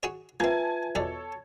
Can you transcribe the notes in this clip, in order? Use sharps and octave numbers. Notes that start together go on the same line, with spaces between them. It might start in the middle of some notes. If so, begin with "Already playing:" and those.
F#4 G#4 C#5
A#3 C4 F4 B4 E5 G#5 A5 G#6
E2 B2 A4 C#5 D5